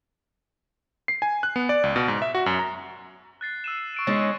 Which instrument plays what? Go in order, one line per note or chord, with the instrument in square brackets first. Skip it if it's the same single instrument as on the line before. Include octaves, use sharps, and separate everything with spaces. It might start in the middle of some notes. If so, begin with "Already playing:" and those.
[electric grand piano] C7
G#5
F#6
B3
D5
C#2
B2
G#2
E5
F#4
F#2
A#5
[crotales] F#6 A6 C7
E6 D#7 E7
C#6 D7 D#7
[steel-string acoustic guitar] G#3 C#4 D#4 [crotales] F#6 A6